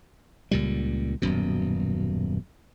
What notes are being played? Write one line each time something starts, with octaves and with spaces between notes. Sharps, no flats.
C#2 A#2 G3
D#1 F#2 B2